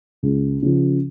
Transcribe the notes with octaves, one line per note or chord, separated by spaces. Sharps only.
C#2
C#3 F3